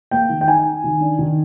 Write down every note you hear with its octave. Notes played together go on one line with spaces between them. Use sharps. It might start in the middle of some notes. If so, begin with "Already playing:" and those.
A#3 G5
D#3
G5
D#4 G#5
D#4
D#3
D4
D#3